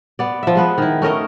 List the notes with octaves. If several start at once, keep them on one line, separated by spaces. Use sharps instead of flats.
B3 D5
F3 E5
G#3 B3 B4
D#3 E4
A3 C#4 A#4 D#5